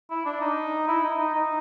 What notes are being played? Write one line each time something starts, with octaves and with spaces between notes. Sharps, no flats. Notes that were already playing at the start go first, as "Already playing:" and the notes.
E4
D4
D#4
E4
D#4
D#4
D#4